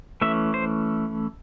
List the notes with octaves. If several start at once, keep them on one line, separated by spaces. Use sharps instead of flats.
E3 A3 C#4 E5
C5